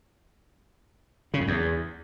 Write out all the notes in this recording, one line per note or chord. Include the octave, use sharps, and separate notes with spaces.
C#3
F2
E2